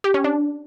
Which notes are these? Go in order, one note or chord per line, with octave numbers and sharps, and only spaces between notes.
G4
C#4
D4